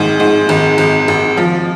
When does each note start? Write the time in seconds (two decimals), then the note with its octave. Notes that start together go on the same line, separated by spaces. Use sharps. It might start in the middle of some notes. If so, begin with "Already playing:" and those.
Already playing: G#1 G#2 D#3
0.20 G#2
0.49 G#1
0.78 G#1
1.08 G#1
1.37 F3